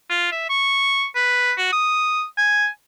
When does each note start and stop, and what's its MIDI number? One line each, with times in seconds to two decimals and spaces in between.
0.10 0.30 65
0.32 0.48 76
0.50 1.05 85
1.15 1.53 71
1.58 1.71 66
1.73 2.24 87
2.38 2.67 80